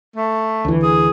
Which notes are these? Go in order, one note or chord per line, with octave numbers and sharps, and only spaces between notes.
A3
D2 E3
G#4